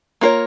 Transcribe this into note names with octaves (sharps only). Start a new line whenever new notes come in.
A#3 F4 A#4 C#5